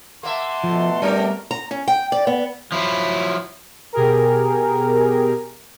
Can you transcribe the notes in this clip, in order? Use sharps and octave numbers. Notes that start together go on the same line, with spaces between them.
A#3 E5 F#5 A5 C6
B2 F3 A3
G3 C4 D4 G4 A#4
A#5
C#4
G5
D5
B3
F3 F#3 E4
B2 G4 G#4 A#4